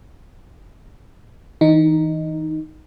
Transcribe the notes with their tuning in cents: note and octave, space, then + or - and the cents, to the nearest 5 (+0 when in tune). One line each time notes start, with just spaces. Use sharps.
E3 -35 D#4 +0